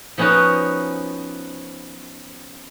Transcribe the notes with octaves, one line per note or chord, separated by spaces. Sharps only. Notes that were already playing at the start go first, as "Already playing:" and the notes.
F3 B3 C#4 D#4 F#4 A#4